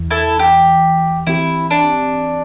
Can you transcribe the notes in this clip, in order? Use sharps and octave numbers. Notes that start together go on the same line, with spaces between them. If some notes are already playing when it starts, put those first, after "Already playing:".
Already playing: E2 E3
E4 A4
G4
E3 C4 E4 G4
D4